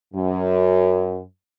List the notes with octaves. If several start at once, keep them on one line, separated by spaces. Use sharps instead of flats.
F#2